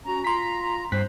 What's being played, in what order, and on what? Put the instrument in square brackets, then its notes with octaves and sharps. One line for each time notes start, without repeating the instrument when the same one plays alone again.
[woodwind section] C#4 F#4 A#5
[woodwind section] F4 A#5 [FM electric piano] C6 B6
[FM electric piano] G2 F#6 B6 [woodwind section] C4 C5